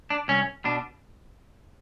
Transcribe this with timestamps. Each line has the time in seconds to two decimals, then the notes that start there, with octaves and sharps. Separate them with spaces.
0.10 D4
0.28 C2 C#4
0.65 B2 D4